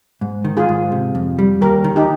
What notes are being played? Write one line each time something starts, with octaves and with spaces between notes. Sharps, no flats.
G#2
D#3
F4 G#4
G#2
C3
F2
G3
D#2 G4 A#4
D#3
D#4 G4